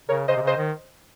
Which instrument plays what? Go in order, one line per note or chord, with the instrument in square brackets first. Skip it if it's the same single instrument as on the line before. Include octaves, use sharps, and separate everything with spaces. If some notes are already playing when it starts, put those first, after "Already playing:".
[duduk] C#3 [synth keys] A#4 C#5
[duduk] C#3 [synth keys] C5 D#5
[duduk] C3
C#3
[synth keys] C5 D#5
[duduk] D#3